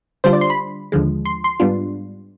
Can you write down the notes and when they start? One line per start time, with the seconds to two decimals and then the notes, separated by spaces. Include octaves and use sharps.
0.24 D3 G3 D4 F4 C5
0.33 D5
0.41 C6
0.50 B5
0.92 D#2 D3 F3 G#3
1.25 C6
1.44 C6
1.60 G#2 G3 B3 D4 F4